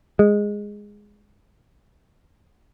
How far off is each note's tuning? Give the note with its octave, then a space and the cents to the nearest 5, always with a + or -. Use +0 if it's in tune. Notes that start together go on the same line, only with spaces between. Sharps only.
G#3 -5